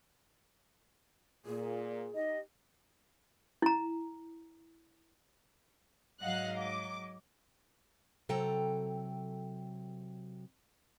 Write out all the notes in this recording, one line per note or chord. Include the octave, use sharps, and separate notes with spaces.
A#2 G#4
D#4 G4 D#5
E4 A#5
G#2 F#3 D#5 F5 F#5 F#6
D6
C3 F#3 A4 G5 A#5